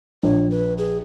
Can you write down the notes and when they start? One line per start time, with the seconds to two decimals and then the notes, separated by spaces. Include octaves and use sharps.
0.23 A#1 C#5
0.51 B4
0.78 G#4